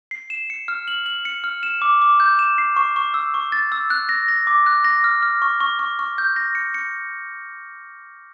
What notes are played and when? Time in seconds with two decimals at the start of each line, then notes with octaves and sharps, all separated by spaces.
0.11 C7
0.30 E7
0.50 C#7
0.68 F6
0.88 F#7
1.06 F#7
1.25 C#7
1.44 F6
1.63 E7
1.82 D6
2.02 D6
2.20 G6
2.39 E7
2.58 C7
2.76 C#6
2.96 C#6
3.14 E6
3.34 C#6
3.52 A6
3.72 E6
3.90 F#6
4.09 A#6
4.28 A#6
4.47 D6
4.66 F#6
4.84 A#6
5.04 F6
5.23 F6
5.42 C#6
5.60 C#6
5.79 C#6
5.99 C#6
6.18 G6
6.36 A#6
6.55 C#7
6.74 C#7